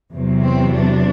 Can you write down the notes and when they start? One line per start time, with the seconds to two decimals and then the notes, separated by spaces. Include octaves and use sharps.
0.13 E2 C3 F#3
0.43 C4
0.75 D4